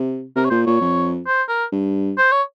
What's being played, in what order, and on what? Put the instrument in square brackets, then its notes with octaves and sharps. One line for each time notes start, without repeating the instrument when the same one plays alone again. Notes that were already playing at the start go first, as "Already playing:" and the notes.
Already playing: [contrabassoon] C3
[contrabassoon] C3 [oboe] A#4
[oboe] C#5
[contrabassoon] A#2 [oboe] C5
[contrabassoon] A#2 [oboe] C#5
[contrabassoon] F2
[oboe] C5
A#4
[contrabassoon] G2
[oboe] C5
C#5